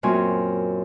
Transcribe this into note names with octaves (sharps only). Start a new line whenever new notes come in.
F#2 A#2 C4 F4 G#5